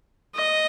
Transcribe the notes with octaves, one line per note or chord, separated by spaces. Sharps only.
D#5